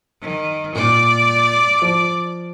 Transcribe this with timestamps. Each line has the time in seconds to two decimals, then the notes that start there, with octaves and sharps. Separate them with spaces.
0.22 D#3
0.75 A#2 D5
1.79 F3 D7